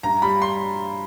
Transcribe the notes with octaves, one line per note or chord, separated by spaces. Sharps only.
G2 A#5
G3 B5
C6